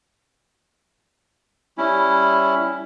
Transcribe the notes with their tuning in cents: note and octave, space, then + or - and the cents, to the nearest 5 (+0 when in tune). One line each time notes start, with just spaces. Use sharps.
G3 +0 C#4 +0 E4 +0